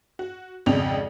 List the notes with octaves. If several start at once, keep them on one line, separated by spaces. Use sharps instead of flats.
F#4
G#1 F2 G#2 C#3 G5 F7